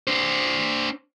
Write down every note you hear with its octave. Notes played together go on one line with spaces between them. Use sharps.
D4 C5